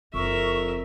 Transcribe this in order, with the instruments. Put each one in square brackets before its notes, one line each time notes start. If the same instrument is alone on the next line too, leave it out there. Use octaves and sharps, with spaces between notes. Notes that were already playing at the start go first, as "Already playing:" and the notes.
[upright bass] F#1 [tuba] F2 [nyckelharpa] A#4 E5 [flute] C#6